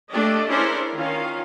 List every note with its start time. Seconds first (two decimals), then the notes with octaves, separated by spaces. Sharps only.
0.12 A3 D4 G4 D#5
0.47 C#4 D4 E4 G#4 A#4 C5
0.94 D#3 C#4 F4 F5